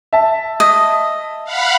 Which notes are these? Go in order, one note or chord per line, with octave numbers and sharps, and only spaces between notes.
E5 A5
D#5
F5 F#5 B5